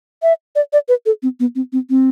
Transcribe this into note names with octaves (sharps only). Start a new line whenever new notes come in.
E5
D5
D5
B4
A4
C4
B3
C4
C4
C4